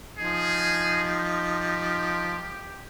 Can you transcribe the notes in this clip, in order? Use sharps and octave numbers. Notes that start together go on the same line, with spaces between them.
F3 D#4 G#4
G4